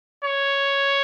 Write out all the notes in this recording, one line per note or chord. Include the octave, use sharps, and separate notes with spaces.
C#5